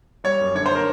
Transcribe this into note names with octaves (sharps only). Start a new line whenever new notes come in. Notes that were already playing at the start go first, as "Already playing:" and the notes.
G3 C#5
F#2
D3 C#5
C5
A#4